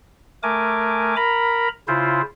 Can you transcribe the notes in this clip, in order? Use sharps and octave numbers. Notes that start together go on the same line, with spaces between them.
A3 A#4 G#5 D6
A#4 A#5 B5
C#3 E4 F4 C5